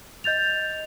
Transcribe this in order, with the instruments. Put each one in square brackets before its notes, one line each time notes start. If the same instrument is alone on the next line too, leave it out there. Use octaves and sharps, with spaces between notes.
[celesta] D#5 G6 A6 F7